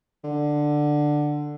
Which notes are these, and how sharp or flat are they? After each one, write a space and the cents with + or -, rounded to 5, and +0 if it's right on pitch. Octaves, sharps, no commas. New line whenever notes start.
D3 +10